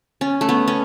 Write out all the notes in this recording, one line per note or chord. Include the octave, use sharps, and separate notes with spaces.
C#4
A3
B3
C#4